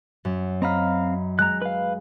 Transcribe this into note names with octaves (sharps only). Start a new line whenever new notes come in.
F#2
C4 D#5 F5 A#5 B5
G#3 A#5 F#6
B4 F5